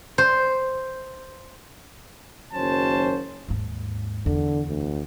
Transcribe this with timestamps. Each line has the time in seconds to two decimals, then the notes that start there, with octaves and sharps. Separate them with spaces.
0.18 C5
2.53 F#1 D#3 F#3 C#4 C5 A5
3.48 D#2 G#2
4.26 E2 D3
4.69 D2